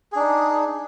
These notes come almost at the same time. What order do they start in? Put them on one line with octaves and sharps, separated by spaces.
G#4 D4 D#4